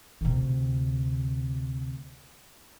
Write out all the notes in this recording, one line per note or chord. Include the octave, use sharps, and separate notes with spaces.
D2 C3